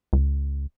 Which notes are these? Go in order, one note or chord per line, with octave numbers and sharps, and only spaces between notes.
C#2